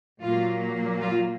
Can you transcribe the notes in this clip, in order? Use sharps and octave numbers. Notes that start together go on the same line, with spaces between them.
A#2 F#3 A#3 F4
F4